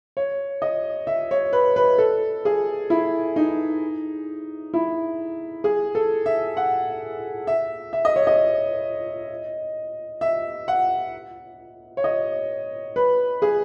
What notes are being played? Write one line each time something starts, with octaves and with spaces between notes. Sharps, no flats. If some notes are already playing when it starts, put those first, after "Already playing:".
C#5
D#5
E5
C#5
B4
B4
A4
G#4
E4
D#4
E4
G#4
A4
E5
F#5
E5
E5
D#5
C#5
D#5
E5
F#5
C#5
D#5
B4
G#4